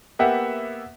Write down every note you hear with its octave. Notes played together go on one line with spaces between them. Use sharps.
A#3 B3 G4 E5 F#5